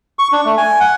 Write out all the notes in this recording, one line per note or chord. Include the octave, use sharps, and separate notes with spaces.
C#6
D4
A3
G#5
F#5